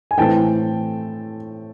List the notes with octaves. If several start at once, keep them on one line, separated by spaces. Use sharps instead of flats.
G#5
A2 E3 A3 C4 G5 A5